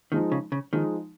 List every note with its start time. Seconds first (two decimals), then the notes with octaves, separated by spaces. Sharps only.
0.12 D#3 F3 G#3 D#4
0.32 C#3
0.52 C#3
0.73 D#3 F3 G#3 D#4